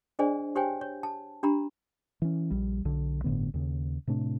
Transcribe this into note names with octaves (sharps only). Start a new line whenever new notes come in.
D4 G#4 C5 D5 D#5 G#5
G4 C5 C#5 G5 G#5
C#5
A5
D4 G4 A#5 B5
E3 C#4
A#1 G3
B1 D3
G1 A2 D3 B3
D#2 C#3
A2 C3 A3 D4